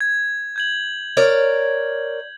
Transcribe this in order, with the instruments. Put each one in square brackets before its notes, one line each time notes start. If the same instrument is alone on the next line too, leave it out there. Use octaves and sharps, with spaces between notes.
[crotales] G#6
G6 G#6 F#7
[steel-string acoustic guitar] A#4 C#5 D5